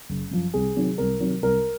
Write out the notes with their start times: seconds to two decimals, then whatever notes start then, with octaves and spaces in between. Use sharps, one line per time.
0.10 F#1
0.31 F#2 F3
0.54 C2 G#4
0.76 C3 D#3 F#3
0.98 C2 A#4
1.20 C3 D#3 F#3
1.42 C2 A#4